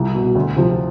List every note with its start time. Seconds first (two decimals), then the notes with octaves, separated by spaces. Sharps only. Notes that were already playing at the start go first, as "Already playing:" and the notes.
Already playing: C2 F4
0.15 B2
0.35 D2
0.56 C3 F3